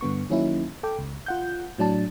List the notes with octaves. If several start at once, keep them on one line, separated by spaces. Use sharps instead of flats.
G2 D3 B3 C#6
D#3 F#3 A#3 C#4 D#4 E4
A4 G5 D6
C#2
F4 F#5 G6
A2 F#3 D4 A5